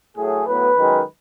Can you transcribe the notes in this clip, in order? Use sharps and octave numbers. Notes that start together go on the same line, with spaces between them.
A2 F#3 A3 G#4
A2 F#3 B3 B4
F#2 D#3 G#3